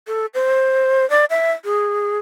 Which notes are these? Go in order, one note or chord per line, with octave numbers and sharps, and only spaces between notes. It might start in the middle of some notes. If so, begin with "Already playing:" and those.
A4
C5
D5
E5
G#4